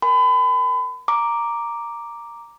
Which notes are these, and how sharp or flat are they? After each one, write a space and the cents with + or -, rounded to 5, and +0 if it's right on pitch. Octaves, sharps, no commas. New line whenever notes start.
A#4 +15 G#5 +0 B5 +35
A#5 +0 D6 +0